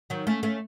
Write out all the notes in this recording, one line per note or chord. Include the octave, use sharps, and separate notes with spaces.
D#3 F#3
A3 C#4
A3 C#4